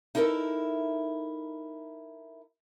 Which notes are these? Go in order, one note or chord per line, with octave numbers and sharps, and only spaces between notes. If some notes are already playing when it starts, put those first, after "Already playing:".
D#4 E4 A4 A#4 D5 E5